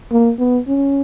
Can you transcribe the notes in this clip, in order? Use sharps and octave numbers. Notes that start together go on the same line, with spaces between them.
A#3
B3
C#4